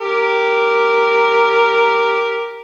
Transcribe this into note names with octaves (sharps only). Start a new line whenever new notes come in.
G4 A#4